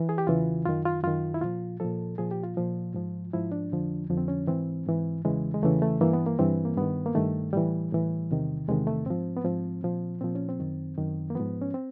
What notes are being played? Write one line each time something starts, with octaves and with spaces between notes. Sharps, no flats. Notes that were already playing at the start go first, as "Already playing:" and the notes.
Already playing: E3
G#4
G4
E2 C#3 E3 F4
F#2 D#3 F4
F4
F#2 D#3 F4
E4
A#2 F3 F4
A#2 F3 A4
A#2 F3 G#4
G4
F4
A#2 F3
G#2 F3
G#2 F3 E4
D4
F2 D3 F3
F2 D3 F3
C4
C#4
G#2 E3 C4
G#2 E3
E2 C#3 E3 G#3
G#3
E2 C#3 E3 A3
A3
G2 E3 A#3
B3
A#3
G2 E3 C4
A#3
G2 D#3 B3
A#3
G2 D#3 A3
A2 E3 G3
A2 E3
E2 C3 D#3
E2 C3 D#3 G#3
A3
G#2 F3 C4
B3
G#2 F3 C4
A#2 F3
A#2 F3 C4
C#4
C4
F#2 D#3
F#2 D#3
A#3
G#2 F3 B3
C#4
C4